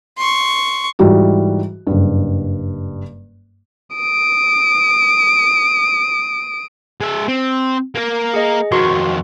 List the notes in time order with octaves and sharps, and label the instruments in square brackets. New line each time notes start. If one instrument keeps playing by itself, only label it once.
[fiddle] C6 C#6
[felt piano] G#2 E3 G3 F#4
F#1 G2
[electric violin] D#6 D7
[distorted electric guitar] G#3 E5
C4
A#3 A#4
[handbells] G#4 D#5
[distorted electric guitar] F2 D#3 [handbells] F#4 C6 C#6